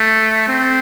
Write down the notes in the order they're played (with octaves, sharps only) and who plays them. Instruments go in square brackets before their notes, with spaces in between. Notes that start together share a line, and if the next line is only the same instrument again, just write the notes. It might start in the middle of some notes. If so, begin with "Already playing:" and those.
Already playing: [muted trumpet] A3
C4